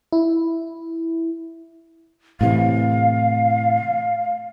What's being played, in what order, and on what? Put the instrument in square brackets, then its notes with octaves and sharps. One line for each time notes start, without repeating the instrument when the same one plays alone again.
[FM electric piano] E4
[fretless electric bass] A2 C3 E3 [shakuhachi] F5